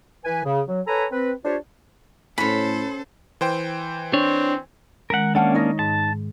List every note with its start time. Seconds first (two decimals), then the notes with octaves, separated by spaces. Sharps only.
0.25 E3 B4 G#5
0.44 C#3
0.68 F#3
0.86 A4 B4 C#5 G#5 A#5 B5
1.12 C4 B4
1.45 D4 F4 G4 C5 C#5
2.38 A2 C#4 F#4 A4 C5 B5
3.41 E3 C5 G5
4.13 C4 D4 C#5
5.10 D#3 G#3 C#4 A#4 F#5
5.35 A#3 C#4 D4 E5 F#5 A5 F6
5.54 D#4 C#5 D#5
5.79 G#2 A5